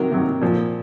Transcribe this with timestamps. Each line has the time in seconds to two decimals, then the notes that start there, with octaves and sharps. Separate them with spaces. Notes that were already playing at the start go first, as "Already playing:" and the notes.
Already playing: C3 D#3 F#3 A#4
0.11 C3 D#3 F#3
0.41 A#2 F3